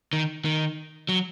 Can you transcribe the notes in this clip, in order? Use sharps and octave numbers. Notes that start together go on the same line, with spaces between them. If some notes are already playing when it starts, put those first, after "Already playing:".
D#3
D#3
F#3